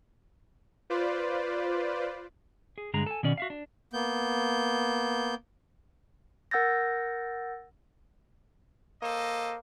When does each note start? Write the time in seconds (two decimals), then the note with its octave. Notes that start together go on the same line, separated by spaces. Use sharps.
0.90 F4 B4 C5 D5
2.78 G#4
2.94 G2 D3 G#3 G#4 A#5
3.06 A4 G#5
3.23 B2 D#3 C#4 D5
3.38 F#4 E5 F5
3.50 D4
3.93 A#3 B3 G6
6.51 A#4 F#5 E6 G6 A6 A#6
9.02 A#3 A4 C5 D#5